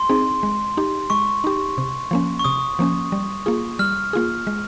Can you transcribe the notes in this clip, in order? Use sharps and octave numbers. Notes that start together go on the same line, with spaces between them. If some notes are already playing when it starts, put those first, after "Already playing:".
Already playing: C6
C4 D#4 G#4
G#3
D#4 G4
G#3 C#6
D#4 G4
C3
F3 A#3 C#4
C#6
C3 D#6
F3 A#3 C#4
G3
A#3 F4 G#4
G3 F6
A#3 F4 G#4
G#3